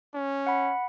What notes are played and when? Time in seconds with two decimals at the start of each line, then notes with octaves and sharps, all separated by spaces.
0.14 C#4
0.47 F#5 B5